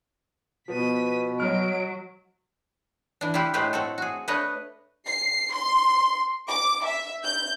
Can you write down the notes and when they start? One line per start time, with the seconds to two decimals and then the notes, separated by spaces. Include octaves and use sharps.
0.68 B2 F3 B3 B6 D#7
1.40 F#3 C#5 D#5 F6 D7
3.21 E3 D4
3.34 E4 F4 G4 B4
3.54 A2 G#3 A3 G4 B4 C5
3.73 C4 F#4 A4
3.98 F#4 G#4
4.28 A3 D4 B4 C#5 D#5
5.06 C7
5.52 C6
6.49 D6
6.85 E5
7.24 G6